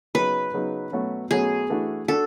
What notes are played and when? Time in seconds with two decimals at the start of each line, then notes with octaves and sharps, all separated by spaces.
0.15 C#3 F#3 B3 D#4 B4
0.53 C#3 F#3 B3 D#4
0.92 B2 F#3 A3 C#4 F#4
1.31 B2 F#3 A3 C#4 F#4 G#4
1.70 E3 A3 D4 F#4
2.08 D4 F#4 A4